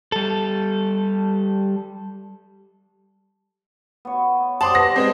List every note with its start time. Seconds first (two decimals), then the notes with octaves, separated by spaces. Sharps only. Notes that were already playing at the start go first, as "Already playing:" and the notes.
0.12 G3 A4
4.05 B3 C#5
4.61 G3 C5 F#5 A5 C6 D6 D#6
4.75 B4 A#6
4.96 G#3 C4 G#4 C5